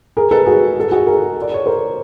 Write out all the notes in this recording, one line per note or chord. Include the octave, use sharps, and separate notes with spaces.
G#4 A#4
A4 B4
F#4 G#4
A4
F#4 G#4
G#4 A#4
D5
C#5
A#4 C5